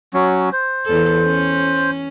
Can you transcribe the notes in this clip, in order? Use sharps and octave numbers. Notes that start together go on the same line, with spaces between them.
F#3 C#4
C5
E2 A4
C#4